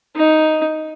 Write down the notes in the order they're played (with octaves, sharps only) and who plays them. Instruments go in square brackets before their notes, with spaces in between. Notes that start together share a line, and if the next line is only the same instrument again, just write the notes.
[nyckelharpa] D#4